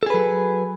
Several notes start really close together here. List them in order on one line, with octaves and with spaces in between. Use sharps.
A4 G#4 B4 F#3